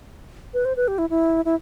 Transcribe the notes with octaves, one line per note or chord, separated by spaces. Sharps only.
B4
C5
B4
G4
E4
E4
E4